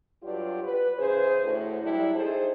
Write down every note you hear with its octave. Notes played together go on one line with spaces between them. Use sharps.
G2 F#3 F4 G4 D5
B4
C#3 E3 G#4 C5
D2 A2
F#3 G3 D4 E4
D#4 E4 G#4 A4 C5